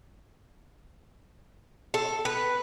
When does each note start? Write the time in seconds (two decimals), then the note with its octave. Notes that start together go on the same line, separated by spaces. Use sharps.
1.94 A4
2.25 B4